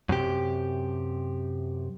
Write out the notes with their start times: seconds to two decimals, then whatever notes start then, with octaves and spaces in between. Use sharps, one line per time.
0.09 F#2 C3 G4